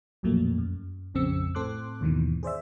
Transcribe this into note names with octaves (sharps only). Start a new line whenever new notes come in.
B1 F2 A#2 F#3 A3 A#3
F#2
A#1 F2 C#3 C4 E6 C#7
A2 C4 A4 C6 D6 F#6
D#2 G#2 B2 D#3 E3
G#4 C5 D5 E5